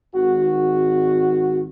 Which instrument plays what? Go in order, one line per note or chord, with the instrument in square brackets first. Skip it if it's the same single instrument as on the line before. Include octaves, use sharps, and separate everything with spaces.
[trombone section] G#1 F#4